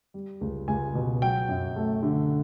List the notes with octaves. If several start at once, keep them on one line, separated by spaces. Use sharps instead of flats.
G3
C#2
C#2 G#5
B2
F#3 G5
F#2
A3
D3